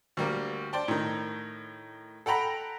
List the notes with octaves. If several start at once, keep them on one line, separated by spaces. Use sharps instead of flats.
D2 G3 A#3
C5 D5 G5 A5
A2 D#3
A4 F#5 G5 A#5 B5